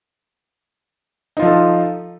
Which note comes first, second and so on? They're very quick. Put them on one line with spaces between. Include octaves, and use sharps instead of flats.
D#4 F4 F3 A4